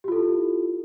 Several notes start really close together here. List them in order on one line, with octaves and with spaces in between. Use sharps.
G4 F4 A4 E4